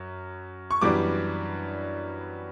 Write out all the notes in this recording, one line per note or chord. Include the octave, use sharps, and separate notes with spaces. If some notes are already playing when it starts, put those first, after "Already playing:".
Already playing: F#2
C#6
F#2 E3 G3 B3 D4 D6